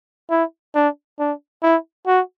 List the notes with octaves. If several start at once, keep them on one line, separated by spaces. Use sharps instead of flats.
E4
D4
D4
E4
F#4